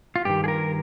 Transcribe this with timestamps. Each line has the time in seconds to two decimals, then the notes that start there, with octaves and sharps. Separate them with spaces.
0.16 F4
0.25 G2 D#3 G4
0.44 G#4
0.48 A#4